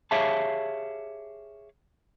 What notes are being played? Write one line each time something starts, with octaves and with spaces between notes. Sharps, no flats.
G4 G#4 C#5 E5 F5 A5